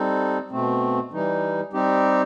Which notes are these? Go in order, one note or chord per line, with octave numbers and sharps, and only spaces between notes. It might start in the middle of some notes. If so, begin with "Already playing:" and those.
Already playing: G3 C4 D#4 A4
B2 A3 C4
E3 G3 D#4
G3 C4 D#4 G4